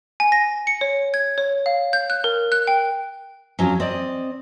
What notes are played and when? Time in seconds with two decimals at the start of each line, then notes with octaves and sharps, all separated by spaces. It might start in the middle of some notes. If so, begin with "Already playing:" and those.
0.20 G#5
0.32 A#6
0.67 C#7
0.81 C#5
1.14 G#6
1.38 C#5
1.66 F5
1.93 G6
2.10 F#6
2.24 A#4
2.52 F#6
2.67 G5
3.59 F2 A#2 F3 F#3 C#4
3.80 C4 D5 D#5